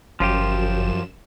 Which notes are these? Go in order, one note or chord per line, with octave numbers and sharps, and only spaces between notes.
G1 F#2 F3 F4 G4 E7